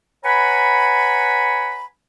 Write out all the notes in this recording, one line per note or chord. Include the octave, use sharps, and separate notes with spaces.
B4 C#5 F#5 G#5 A#5 B5